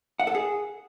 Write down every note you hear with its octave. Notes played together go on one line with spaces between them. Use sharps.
F#5
A4
G#4